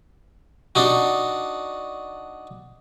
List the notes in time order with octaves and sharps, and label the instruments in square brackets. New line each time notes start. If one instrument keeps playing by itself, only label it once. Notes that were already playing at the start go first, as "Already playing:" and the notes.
[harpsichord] D4 D#4 F#4